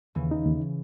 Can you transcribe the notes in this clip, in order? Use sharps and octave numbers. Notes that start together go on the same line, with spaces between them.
D#2 C#3 E3
D#4
D#2